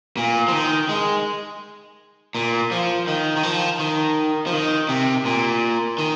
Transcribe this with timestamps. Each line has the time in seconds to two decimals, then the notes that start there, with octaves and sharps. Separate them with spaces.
0.17 A#2
0.48 F3
0.52 D#3
0.89 G#3
2.35 A#2
2.71 F3
3.08 D#3
3.36 D#3
3.43 F3
3.79 D#3
4.47 F3
4.53 D#3
4.89 C3
5.25 A#2
5.98 D#3